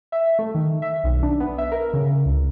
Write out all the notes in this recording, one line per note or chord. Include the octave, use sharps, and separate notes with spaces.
E5
A3
D#3
E5
B1
D4
B3
E5
A#4
C#3
C#2